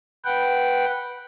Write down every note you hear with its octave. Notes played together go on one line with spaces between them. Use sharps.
B4 F#5 G5